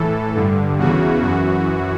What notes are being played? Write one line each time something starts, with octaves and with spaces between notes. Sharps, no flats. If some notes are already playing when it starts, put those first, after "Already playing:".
Already playing: A2 E3 A4
G2 D3
E2 C#3 E3 F#4
F#2 E3 F#4